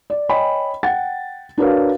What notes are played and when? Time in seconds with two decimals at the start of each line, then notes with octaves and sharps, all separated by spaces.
0.10 D5
0.29 C#5 D#5 G5 G#5 B5
0.83 F#5 G5 A6
1.58 D4 F#4 A#4 B4 C#5 F5